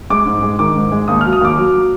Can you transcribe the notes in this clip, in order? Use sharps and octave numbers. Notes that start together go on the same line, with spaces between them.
G#3 D6
G#2
G#3
D#3 D6
G#2
G#3
D#2 D#6
F#3 F6
D#6
D#2 D6
F#3
F#3